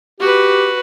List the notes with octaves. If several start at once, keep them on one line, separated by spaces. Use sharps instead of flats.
F#4 G4 B4